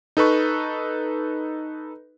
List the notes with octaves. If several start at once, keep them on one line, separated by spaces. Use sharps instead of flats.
D#4 A4 B4 C#6